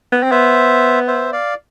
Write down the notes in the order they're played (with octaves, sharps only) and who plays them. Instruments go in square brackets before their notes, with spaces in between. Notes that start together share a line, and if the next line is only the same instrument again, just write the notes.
[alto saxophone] B3
C4
[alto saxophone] B3 [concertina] C5 E5
[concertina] C5 E5
D5 F5